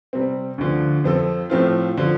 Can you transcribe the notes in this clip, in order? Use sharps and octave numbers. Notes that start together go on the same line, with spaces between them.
C3 G3 C4
D2 D3 F3
F2 F3 C4 A4
A2 F3 A3 C4 F4
D3 F3